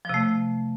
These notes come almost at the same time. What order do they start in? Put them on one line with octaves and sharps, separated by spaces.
F3 C3 A3